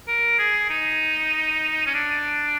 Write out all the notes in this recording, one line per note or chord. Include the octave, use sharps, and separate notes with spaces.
A#4
G#4
D#4
C#4
D4